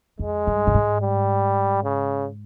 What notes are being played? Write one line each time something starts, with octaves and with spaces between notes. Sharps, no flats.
F2 G#3
G2
A2
G#2
G3
C#3